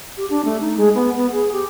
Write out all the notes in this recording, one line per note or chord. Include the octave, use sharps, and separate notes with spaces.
G4
D4
A3
D#4
G#3
B3
B3
G#4
G4